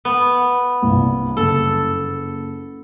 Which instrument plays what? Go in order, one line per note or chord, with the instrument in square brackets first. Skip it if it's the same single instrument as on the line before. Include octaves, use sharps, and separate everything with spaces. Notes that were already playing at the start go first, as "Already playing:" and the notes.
[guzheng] B3
[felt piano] C2 G2 A#3
[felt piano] F#1 [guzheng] A4